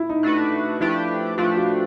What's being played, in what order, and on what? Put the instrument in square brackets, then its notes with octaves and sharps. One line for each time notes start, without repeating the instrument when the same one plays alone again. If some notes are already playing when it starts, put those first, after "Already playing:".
Already playing: [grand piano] E4
D#4
[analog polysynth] A3 D4 F#4 B4
[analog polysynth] F3 A3 D4 G4 B4 [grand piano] E4
[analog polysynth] F3 A3 D4 G4 B4 [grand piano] F4
[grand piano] F#4